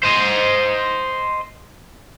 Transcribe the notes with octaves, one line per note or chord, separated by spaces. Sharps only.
C5 D#5